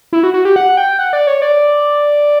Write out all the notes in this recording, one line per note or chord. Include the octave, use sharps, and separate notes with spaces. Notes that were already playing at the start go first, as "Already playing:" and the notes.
E4
F#4
F#4
G4
F#5
G5
F#5
D5
C#5
D5